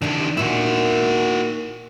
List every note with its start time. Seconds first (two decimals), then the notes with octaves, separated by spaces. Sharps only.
0.02 C3 D#3 E3 D4
0.37 A#2 D#3 E4 F#4